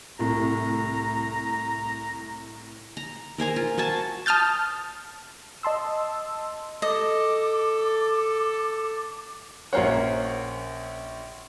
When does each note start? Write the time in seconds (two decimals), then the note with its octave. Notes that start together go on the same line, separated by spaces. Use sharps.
0.19 C2 A2 A#5
2.97 A#5
3.38 A#4 C5 G#5 A#5
3.56 F4
3.77 F#4 C5 G#5 A5
4.26 A5 D#6 F6 G6 A6
5.63 D#5 A5 C6 E6
6.82 A4 D#5 D6
9.73 A#1 A#3 C#4 C5 C#5 F#5